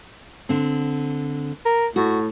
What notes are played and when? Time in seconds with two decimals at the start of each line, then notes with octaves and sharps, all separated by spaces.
0.49 D3 C4
1.65 A#4
1.96 A2 F#4